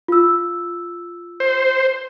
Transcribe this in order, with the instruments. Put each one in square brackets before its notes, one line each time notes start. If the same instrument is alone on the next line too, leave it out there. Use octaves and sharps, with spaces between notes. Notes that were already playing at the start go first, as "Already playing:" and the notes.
[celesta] F4 E6
[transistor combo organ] C5